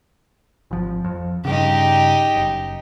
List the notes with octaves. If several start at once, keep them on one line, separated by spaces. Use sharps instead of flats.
G#1 F3
F2
G2 C#3 D#4 G4
F#1